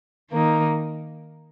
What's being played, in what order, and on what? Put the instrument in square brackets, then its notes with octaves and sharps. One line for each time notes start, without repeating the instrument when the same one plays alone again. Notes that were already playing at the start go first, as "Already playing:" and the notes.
[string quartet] D#3 A#3 D#4